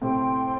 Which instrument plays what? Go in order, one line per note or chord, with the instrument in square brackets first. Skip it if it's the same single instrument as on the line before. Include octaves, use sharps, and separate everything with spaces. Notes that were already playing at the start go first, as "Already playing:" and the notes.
[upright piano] A2 C3 [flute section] A4 C5 G5 C6